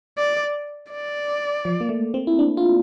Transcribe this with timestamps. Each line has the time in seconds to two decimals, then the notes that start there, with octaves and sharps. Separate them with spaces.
0.18 D5
0.91 D5
1.65 F3
1.81 A#3
1.89 A3
2.14 C4
2.27 E4
2.39 D4
2.57 F4